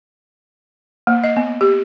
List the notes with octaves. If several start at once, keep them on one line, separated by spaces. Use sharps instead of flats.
A#3
D#5
B3
G4